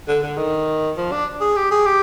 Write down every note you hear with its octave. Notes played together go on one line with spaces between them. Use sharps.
D3
D3
D#3
F3
D4
G#4
G4
G#4
G4